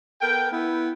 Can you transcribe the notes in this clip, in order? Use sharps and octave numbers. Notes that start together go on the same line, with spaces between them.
B3 A4 A#4 G5
B3 E4